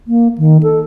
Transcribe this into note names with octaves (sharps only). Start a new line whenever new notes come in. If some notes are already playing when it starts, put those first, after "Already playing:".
A#3
D#3
A4